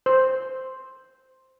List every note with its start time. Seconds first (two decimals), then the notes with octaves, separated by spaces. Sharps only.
0.06 C5